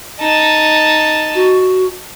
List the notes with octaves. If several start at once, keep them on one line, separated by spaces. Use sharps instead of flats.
D#4 A5
F#4